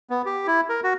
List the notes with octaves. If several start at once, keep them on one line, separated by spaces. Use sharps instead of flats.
B3
G4
E4
A#4
F#4